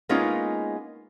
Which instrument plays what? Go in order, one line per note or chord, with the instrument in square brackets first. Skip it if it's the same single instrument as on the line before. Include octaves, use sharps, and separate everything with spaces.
[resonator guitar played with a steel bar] G#3 A#3 B3 C#4 D#4 F4